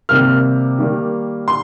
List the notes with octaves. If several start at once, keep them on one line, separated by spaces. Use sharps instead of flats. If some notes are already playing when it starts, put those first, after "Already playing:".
C3 D#3 G3 A#3 F6
D#3 G3 A#3
C6